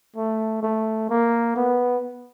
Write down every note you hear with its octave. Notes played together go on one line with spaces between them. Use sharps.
A3
A3
A#3
B3